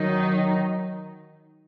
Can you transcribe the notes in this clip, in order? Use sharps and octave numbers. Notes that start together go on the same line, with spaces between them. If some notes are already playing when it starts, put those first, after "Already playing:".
Already playing: D#3 F#3 D#4